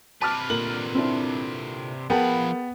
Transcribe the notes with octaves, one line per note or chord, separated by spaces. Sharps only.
C3 B4 A5 D6 F6
A#2 D3 A#4 F#7
C4 D4 E4
F3 B3 G#4 A#4 G5 A5 B5